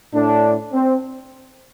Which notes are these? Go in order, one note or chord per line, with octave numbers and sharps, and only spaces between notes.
A2 D4
C4